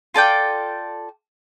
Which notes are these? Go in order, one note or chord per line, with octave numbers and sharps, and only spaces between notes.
F4 A4 D5 G5